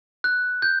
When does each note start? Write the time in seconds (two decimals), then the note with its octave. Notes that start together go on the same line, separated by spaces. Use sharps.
0.24 F#6
0.62 G6